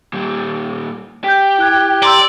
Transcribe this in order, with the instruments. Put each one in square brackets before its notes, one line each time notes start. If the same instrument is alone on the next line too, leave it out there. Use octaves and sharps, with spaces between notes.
[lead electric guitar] A#2 G3
[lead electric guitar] G4 [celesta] G6 B6
[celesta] E4 F#6 G#6
[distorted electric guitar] D5 [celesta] A#5 C6 E6